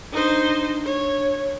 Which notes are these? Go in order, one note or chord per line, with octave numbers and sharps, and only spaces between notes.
D4 D#4 C5
C#5